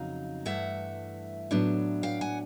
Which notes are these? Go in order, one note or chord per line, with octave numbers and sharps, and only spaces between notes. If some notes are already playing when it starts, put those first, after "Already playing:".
Already playing: F2 C#3 F#3 D#4 F5
G2 E3 A3 E5 F#5
A2 F#3 B3 D4
F5 G5
F#5 G#5